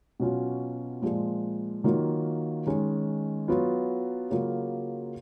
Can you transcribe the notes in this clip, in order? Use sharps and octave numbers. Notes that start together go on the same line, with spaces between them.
B2 F#3 C#4 F4
A#2 F3 G#3
D#3 F#3 A#3 F4
D#3 G#3 C#4
F#3 B3 F4
C#3 F#3 A#3 F4